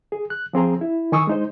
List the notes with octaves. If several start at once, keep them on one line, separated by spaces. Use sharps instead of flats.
G#4
F#6
F3 C4 G#4 A#5
E4
D#3 G#5 C#6 D#6 E6
G#3 D#4 C5